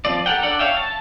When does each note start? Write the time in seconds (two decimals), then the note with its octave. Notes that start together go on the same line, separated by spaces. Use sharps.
0.05 F3 C4 D5
0.26 G4 A4 A#4 F#5 G5
0.43 D4 A4 D5 F#5
0.59 C#5 E5 F5 G5
0.77 A5